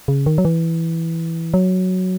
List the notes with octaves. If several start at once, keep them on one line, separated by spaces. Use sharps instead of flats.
C#3
D#3
F#3
E3
F#3